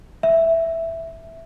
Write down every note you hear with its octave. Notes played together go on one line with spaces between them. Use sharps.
E5